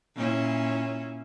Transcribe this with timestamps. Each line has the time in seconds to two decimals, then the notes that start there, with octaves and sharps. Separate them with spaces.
0.15 A#2 C#4 E4